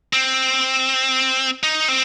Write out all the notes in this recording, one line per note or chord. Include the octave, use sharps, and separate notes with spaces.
C4
D#4
C4